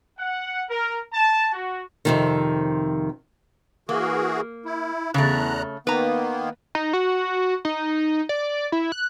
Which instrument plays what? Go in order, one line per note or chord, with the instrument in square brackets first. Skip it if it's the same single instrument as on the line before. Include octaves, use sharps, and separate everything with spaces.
[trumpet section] F#5
A#4
A5
F#4
[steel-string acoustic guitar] F2 C3 D#3
[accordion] E3 F#4 G#4 [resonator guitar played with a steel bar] A#3
[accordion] E4
[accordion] E2 A#5 F#6 [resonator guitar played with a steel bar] C#3 A3
[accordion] D#3 A#3 B3 [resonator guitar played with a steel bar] B4 A#5
[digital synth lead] D#4
F#4
D#4
D5
E4
F#6